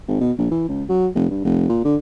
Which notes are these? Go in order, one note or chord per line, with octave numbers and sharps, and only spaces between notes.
G#1
B2
A#1
E3
C#2
F#3
F1
G2
F1
A#2
D3